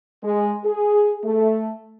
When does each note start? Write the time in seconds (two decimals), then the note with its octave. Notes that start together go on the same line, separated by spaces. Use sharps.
0.24 G#3
0.65 G#4
1.25 A3